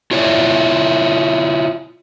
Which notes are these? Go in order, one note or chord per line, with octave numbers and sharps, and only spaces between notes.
E4 F4 C#5 D5 E5